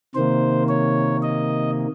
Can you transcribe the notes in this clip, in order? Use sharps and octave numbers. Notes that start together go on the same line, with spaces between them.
C3 D#3 A#3 C5
C#5
D#5